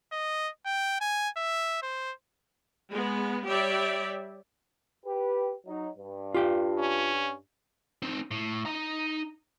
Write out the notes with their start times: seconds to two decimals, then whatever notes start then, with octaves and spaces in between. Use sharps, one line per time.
0.12 D#5
0.66 G5
1.01 G#5
1.37 E5
1.82 C5
2.89 G#3 B3
3.45 G3 G4 C#5 D5 E5
5.06 G4 B4
5.66 F#3 D#4
5.98 G2
6.34 F4 G4 G5
6.78 C#4
8.02 C4 D#4
8.31 A2
8.65 D#4 A#5